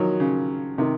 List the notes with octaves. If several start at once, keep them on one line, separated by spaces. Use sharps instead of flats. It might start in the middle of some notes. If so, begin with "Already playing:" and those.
Already playing: D#3 F3 F#3
C#3
C3 D#3